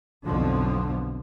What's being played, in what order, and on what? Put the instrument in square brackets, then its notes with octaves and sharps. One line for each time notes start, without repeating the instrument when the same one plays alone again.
[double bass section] B1 F2 B2 D3 F3